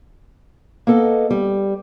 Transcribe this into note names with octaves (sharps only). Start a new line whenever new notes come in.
A#3 B3 A4 D#5
G3